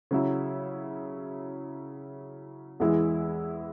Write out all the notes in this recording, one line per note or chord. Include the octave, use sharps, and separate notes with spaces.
C#3 F#3 E4
E2 E3 G#3 E4